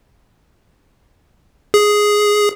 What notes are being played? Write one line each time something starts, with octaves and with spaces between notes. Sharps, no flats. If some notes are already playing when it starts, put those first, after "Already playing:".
G#4